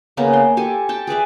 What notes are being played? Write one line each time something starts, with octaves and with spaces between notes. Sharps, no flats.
C#3 A#3 B3 C#4
C6
G4 A4 G#5
G5 A5
G#4 B4 D5 E5